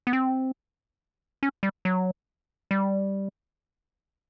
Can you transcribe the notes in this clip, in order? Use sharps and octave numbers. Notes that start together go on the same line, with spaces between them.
B3
C4
C#4
G3
F#3
G3